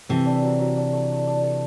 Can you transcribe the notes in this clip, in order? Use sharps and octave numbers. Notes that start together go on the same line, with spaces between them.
C3 E3 A3
D4
F#3
F#3
D4
A3
D4
D4
A4